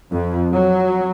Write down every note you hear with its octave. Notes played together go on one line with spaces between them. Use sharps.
F2
F#3